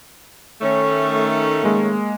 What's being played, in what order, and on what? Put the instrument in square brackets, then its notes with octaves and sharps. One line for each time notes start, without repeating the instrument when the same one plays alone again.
[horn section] D#3 A3 C#4
[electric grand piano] G#3 A#3